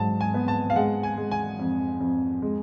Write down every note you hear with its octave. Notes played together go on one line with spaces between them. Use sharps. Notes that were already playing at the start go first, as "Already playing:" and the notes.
Already playing: G#2 F#3 A5
G#5
B3
A5
F5
G#3 F#5
G#5
G#3
G#5
F2
F2
G#3